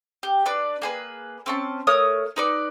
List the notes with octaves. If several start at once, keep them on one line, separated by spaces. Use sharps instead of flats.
G4
D4 B4 D5
A#3 G#4 B4
C4 C#4 A5
A3 A#4 C#5 D#6
D#4 B4 D5